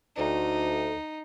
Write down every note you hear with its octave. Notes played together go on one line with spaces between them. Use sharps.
D2 D#4